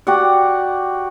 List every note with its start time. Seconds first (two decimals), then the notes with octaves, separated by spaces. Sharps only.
0.07 F#4 G4 D5 F#5